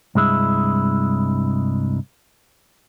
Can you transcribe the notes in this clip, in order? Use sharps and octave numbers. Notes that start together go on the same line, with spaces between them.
C2 G2 G#3 E4